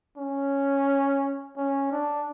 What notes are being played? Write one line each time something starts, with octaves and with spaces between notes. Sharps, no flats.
C#4
C#4
D4